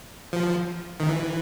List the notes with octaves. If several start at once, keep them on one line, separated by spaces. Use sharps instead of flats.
F3
D#3
E3